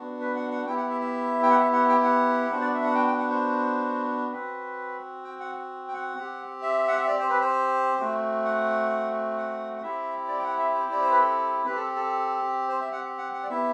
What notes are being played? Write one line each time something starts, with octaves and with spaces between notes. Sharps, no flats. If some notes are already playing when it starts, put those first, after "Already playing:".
Already playing: B3 D4 F#4
B4
F#5
F#5
B3 E4 G4 G5
F#5
E5
E5
G5
F#5
E5
F#5
G5
F#5
B3 D4 F#4 C5
D5
E5
F#5
G5
G5
F#5
C5
C4 F#4 B4
G5
F#5
G5
F#5
C4 G4
E5
F#5
E5
D5
C5
B4
C5
A3 C4 F#4
F#5
F#5
F#5
C4 E4 G4 E5
D5
G5
F#5
E5
C5
D5
C5
B4
A4
C4 G4 B4
A4
A4
C5
E5
F#5
F#5
F#5
D5
B3 E4 G4 E5